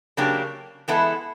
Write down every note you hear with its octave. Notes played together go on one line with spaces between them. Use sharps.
C#3 F#3 A#3 D4 G4
E3 G#3 B3 E4 A4